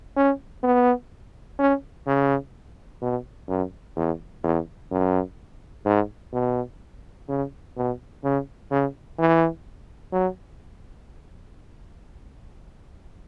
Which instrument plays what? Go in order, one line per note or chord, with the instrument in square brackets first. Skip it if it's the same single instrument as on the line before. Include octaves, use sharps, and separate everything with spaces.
[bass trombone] C#4
B3
C#4
C#3
B2
F#2
E2
E2
F#2
G#2
B2
C#3
B2
C#3
C#3
E3
F#3